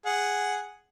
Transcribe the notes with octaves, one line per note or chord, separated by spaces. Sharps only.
G#4 F#5